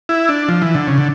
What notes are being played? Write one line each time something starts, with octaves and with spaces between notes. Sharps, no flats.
E4
D4
F3
E3
D3
C#3
D3